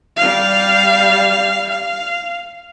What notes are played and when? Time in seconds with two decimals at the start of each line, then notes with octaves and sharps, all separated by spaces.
0.16 G3 F5
1.69 F5